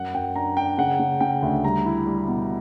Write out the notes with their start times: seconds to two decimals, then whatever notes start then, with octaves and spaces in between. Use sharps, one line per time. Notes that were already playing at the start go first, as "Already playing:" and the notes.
Already playing: F#2 F#5
0.14 F#2 G5
0.36 D4 A#5
0.57 D4 G5
0.78 C#3 F#5
0.99 C#3
1.20 C#3 G5
1.42 D2
1.64 G3 A#5
1.85 E4
2.07 G3
2.28 B2